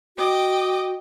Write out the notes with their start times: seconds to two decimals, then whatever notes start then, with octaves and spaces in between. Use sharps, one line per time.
0.17 F#4 D#5 G5 D6